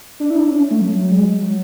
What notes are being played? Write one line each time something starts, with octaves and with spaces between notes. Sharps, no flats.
D4
E4
D4
C#4
A3
F#3
G#3
F#3